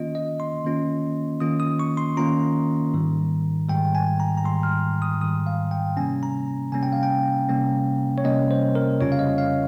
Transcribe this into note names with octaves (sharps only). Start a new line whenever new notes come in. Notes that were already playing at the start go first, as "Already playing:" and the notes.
Already playing: D#3 A#3 C#4 F4 D#5
D#5
C6
D#3 A#3 C#4 F4
D#3 A#3 C#4 F4 D#6
D#6
C#6
C6
D#3 A#3 C#4 F4 A#5
G#2 D#3 G3
G#2 D#3 G3 G5
G#5
A#5
A#5
G#2 D#3 G3 C6
F6
D#6
G#2 D#3 G3 D#6
F5
G5
C3 G3 A#3 C#4 G#5
A#5
C3 G3 A#3 C#4 G#5
G5
F5
G5
C3 G3 A#3 C#4
C#5
C3 G3 A#3 C#4 D#5
C5
A#4
F2 C#3 G3 C#4 F4 C#5
F5
D#5
F5